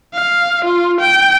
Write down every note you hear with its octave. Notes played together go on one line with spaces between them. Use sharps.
F5
F4
G5